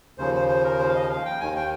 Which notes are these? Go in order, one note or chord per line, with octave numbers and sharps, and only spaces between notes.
D#2 C#3 F3 C5
C5
C5
A#4
C5
F5
D#5
F5
G5
D#2 D#3 G#5
G5